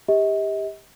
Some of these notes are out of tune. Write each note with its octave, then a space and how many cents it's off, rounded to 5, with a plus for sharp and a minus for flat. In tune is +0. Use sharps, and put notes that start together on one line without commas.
G4 +20 D#5 +40